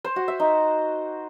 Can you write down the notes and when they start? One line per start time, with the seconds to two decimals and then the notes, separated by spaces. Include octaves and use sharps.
0.04 C5
0.16 F#4
0.28 E5
0.40 D#4